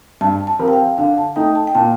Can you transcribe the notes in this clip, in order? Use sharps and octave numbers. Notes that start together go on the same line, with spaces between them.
G2 A5
A5
F3 C4 G4 A#4
G5
F5
D3 F5
A5
A3 D#4 G5
A5
G5
A#2 A5